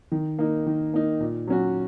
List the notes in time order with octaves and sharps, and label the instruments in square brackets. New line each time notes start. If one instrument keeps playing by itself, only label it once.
[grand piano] D#3
A#3 D#4
D#3
A#3 D#4
A#2
F#3 C#4 F#4